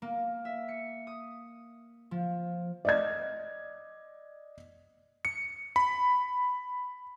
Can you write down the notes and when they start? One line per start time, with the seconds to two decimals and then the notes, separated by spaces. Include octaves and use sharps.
0.02 A#3
0.45 E5
0.68 C#7
1.07 D#6
2.11 F3
2.85 D5 D#5 G#6
5.25 C#7
5.76 B5